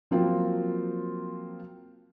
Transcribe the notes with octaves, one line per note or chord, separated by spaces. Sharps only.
F3 F#3 A#3 C4 F4 F#4